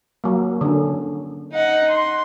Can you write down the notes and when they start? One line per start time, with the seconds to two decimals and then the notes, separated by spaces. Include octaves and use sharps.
0.24 F#3 A#3
0.61 D3 C#4
1.53 D#4 F#5
1.90 C6